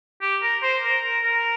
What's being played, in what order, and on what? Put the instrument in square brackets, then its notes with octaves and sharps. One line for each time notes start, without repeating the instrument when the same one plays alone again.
[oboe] G4
A#4
C5
A#4
A#4
A#4